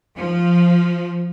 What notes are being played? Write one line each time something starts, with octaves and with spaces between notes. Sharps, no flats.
F3